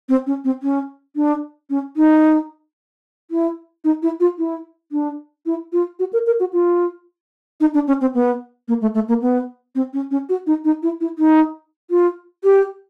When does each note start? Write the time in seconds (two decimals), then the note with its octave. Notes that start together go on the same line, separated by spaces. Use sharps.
0.09 C4
0.27 C#4
0.45 C4
0.63 C#4
1.16 D4
1.70 C#4
1.97 D#4
3.31 E4
3.84 D#4
4.03 E4
4.20 F4
4.38 E4
4.92 D4
5.46 E4
5.73 F4
5.99 F#4
6.13 A#4
6.27 A#4
6.40 F#4
6.53 F4
7.60 D#4
7.74 D4
7.88 C#4
8.01 C4
8.14 B3
8.68 A#3
8.82 A3
8.95 A3
9.08 A#3
9.22 B3
9.75 C4
9.93 C#4
10.11 C#4
10.29 F#4
10.47 D#4
10.65 D#4
10.83 E4
11.01 E4
11.19 D#4
11.90 F4
12.44 G4